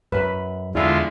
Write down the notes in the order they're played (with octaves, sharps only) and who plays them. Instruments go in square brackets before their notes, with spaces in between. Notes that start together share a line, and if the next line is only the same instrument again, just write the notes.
[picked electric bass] F#2 [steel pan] B4 B5
[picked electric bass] E2 [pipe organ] D3 G#3 F4 [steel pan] E4 E5